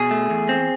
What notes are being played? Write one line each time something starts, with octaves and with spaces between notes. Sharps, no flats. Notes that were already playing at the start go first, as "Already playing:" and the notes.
Already playing: B2 G#4
A3
E2
C4